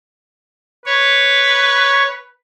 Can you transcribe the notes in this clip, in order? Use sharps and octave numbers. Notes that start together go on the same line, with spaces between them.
B4 C#5